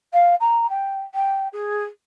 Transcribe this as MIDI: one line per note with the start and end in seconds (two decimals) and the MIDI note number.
0.13 0.35 77
0.40 0.69 82
0.69 1.02 79
1.14 1.47 79
1.53 1.84 68